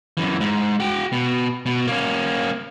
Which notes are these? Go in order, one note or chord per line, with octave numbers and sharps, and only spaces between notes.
F#2 E3
G#2
F#4 G5
B2
B2
A#3 C#4